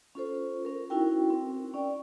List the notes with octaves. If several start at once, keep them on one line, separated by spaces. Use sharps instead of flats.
C#4 F4 A4 C5
C#4 A#4
C#4 D#4 E4 F#4 A#4 G5
C4 A#4
C#4 D5 G5